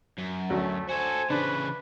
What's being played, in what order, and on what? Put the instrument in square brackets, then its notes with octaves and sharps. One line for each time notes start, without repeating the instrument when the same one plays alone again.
[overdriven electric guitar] F#2
[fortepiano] D2 F#3 [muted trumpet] A3 [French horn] C#4
[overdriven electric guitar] F#4 A4 [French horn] C5 [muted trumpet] G#5
[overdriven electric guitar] C#3 E3 [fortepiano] D4 [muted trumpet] B4